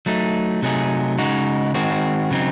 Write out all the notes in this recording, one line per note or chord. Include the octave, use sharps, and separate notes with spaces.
F#3 A3 D#4
C3 F#3 A3 D#4 G#4
C#3 G#3 D#4 F#4
D#3 G#3 C4 F#4
C#3 F#3 C4 D#4